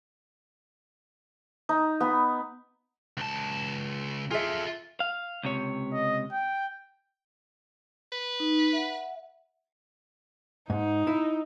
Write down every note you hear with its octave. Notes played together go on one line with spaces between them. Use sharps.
D#4
B3 B5
C#2 A5
F4 G#4 A4 E5
F5
C#2 C3 C#5
D#5
G5
B4
D#4
E5 F#5
G#2 D#4
E4